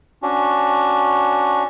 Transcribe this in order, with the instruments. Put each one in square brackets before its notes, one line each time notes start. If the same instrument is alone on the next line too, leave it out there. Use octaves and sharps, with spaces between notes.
[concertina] C#4 D4 F#4